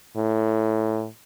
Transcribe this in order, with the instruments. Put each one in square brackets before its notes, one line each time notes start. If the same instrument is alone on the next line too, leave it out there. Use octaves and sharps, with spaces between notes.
[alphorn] A2